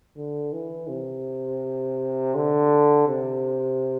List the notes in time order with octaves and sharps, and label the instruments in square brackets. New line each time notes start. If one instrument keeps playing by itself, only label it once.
[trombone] D3
E3
C3
D3
C3